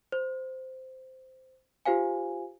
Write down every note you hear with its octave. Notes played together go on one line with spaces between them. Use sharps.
C5
F4 G4 C5 F5 G#5